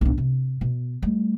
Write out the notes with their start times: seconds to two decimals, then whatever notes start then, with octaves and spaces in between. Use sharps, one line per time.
0.01 B1 D4
0.18 C3
0.61 B2
1.02 G3 A3